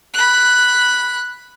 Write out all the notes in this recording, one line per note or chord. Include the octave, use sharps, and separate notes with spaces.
B5 F#6